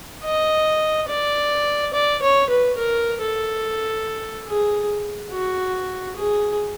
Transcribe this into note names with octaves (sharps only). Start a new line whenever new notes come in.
D#5
D5
D5
C#5
B4
A#4
A4
G#4
F#4
G#4